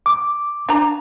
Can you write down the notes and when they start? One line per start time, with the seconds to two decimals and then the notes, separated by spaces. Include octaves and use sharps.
0.06 D6
0.69 D4 A#5